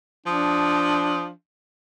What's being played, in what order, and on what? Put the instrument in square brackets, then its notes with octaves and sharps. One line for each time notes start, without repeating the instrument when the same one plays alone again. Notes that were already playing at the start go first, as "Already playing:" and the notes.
[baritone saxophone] F3 [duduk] D4 [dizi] D#6